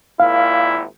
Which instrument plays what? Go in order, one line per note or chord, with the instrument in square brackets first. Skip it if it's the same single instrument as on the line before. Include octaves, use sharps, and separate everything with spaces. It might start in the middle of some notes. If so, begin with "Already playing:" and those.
[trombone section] G#1 A#2 E4 [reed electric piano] F5